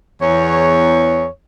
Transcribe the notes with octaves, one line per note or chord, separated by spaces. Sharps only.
E2 C#5